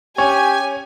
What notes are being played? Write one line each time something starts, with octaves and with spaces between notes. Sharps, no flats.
C#4 G4 C#5 G#5